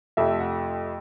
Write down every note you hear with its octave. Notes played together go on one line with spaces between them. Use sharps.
F2 C3 F3 A3 E5
F#5